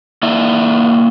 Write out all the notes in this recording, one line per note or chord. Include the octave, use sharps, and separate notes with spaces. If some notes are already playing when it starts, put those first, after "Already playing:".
A#3 E4 D5 E5